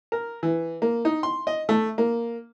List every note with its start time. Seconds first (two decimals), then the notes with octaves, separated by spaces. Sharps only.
0.12 A#4
0.43 E3
0.82 A#3
1.05 D#4
1.23 C6
1.47 D#5
1.69 A3
1.98 A#3